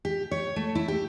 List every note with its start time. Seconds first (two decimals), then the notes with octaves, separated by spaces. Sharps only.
0.05 G4
0.31 C#5
0.56 A3
0.75 E4
0.88 G4